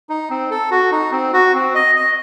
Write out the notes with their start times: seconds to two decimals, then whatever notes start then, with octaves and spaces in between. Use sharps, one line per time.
0.10 D#4
0.30 C4
0.50 A4
0.71 F#4
0.92 D#4
1.12 C4
1.33 F#4
1.54 C4
1.75 D#5
1.96 D#5